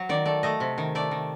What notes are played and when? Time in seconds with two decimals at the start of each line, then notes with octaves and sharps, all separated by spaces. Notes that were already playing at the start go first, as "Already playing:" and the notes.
Already playing: F#3
0.09 D#3 D5
0.26 A3 D5
0.43 A3 D#5
0.60 C3
0.78 D#3
0.95 A3 D5
1.11 D#3